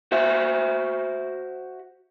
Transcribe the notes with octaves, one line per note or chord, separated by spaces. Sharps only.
F#4 C5 E5